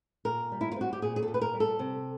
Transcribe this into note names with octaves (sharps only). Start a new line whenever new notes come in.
A#2 A#4
G3
E4
F4
C4 F#4
G4
A#2 G#4
G#4
A4
A#2
B4
A#4
G3
A4
C3